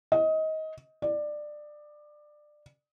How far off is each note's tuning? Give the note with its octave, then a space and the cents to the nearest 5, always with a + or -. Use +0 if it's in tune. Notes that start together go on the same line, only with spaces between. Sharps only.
D#5 +20
D5 +20